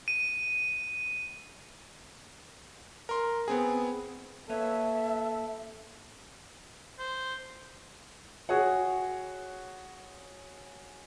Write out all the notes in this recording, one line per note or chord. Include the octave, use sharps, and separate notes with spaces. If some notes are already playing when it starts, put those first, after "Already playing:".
D#7
A#4 C6
B3 C4 G#4
A#3 A4 B4 C#5 E5
C5
F#4 G#4 C#5 F#5